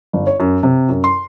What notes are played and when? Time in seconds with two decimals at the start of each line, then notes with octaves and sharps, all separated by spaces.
0.13 G1
0.27 C#5
0.40 F#2
0.63 C3
0.89 F#2
1.04 C6